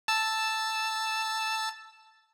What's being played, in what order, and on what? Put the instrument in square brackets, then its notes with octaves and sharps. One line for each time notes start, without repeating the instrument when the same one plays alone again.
[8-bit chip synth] A5 E6